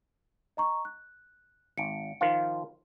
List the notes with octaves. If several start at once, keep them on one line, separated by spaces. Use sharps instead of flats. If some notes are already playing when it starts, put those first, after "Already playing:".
D#5 A#5 C#6
F#6
G#1 C#7 D7
D#3 F3 F4